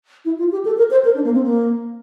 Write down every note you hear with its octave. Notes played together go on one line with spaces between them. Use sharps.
E4
F4
G4
A4
A#4
C5
A#4
D4
A#3
C4
A#3